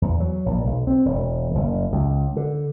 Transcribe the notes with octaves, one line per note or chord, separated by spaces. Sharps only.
E2
F#3
A#1
B1
C4
E1
F#1
C#2
D3